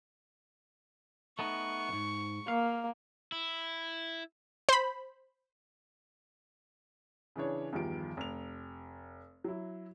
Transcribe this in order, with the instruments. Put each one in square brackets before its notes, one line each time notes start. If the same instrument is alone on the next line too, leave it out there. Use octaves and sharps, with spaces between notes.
[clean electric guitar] A3 B3 D#4 [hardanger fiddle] C#6
[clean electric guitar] C#2 G#2
[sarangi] A#3 [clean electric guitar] F5
[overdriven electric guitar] E4
[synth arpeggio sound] C5 B5
[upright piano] C#3 E3 D4 C#5
E2 G2 D#3 F3 D7
F1 F7
F#3 E4